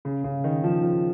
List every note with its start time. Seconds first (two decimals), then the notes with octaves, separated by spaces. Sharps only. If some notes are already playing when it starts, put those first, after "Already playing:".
0.05 C#3
0.24 C#3
0.44 D#3
0.64 F3
0.83 F3